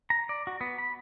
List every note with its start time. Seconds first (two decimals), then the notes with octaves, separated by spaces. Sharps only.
0.10 A#5
0.29 D5
0.47 F#4
0.61 B3
0.78 B5